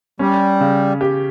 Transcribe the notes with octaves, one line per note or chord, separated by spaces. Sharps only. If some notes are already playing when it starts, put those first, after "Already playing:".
G3 C#4
C#3
G4